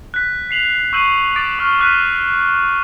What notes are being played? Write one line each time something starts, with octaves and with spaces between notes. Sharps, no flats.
F#6 B6
B6 C7 F7 F#7
C#6 E6 G6 C7 D#7 F#7
D6 A6 D7
C#6 F6
D6 F6 F#6 B6 D#7